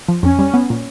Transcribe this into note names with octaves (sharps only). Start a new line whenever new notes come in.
F3
F2 C#4
G3
B3
A#2